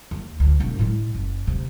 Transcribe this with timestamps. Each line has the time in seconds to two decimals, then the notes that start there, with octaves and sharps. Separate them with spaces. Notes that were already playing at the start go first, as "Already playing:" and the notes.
0.11 D#2
0.40 D2
0.60 E1 D4
0.79 A2 G#3
1.15 F#1
1.47 D2 C3